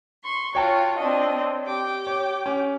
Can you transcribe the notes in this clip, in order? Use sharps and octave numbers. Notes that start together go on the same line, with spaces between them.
C6 C#6
F4 F#4 C#5 G5 A5
C4 D4 D#5
G4 G5 D6
C#5
C#4